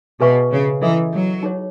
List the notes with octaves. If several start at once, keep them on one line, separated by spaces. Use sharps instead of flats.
B2 G#4 B4 E5 G#5 C#6
C#3
E3 E4 A4 D#5
F#3
D#4 G#4 C#5